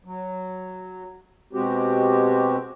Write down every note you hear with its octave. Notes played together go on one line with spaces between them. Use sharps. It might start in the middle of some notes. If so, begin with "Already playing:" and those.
F#3
B2 G#3 C4 F#4 G4